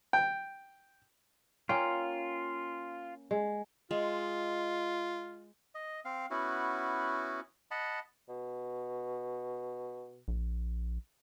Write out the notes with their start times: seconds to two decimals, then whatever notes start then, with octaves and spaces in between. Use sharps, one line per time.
0.13 G5
1.69 A#3 C#4 F4 G5
3.31 G#3
3.91 G#3 F4
5.75 D#5
6.05 C4 F5
6.31 B3 C#4 E4 F#4
7.71 D#5 F#5 A5 B5
8.29 B2
10.28 A#1